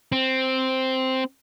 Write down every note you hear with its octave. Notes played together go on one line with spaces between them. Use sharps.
C4